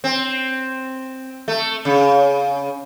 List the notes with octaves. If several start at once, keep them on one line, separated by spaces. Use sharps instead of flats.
C4
A3
C#3